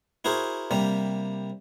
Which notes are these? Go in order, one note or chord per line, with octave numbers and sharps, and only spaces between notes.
E4 F#4 G#4 A#4 C5
C3 G3 A#3